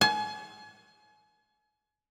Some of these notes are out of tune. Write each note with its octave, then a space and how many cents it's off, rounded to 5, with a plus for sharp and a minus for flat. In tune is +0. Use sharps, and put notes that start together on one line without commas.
G#5 +35